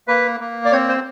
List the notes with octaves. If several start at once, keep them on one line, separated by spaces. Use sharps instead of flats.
A#3 B4
A#3
D5
C4 C#5
C5